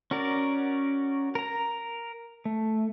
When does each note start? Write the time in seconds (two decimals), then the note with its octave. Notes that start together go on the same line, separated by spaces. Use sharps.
0.11 C#4 F#4 A#4 D5
1.35 A#4 A#5
2.45 A3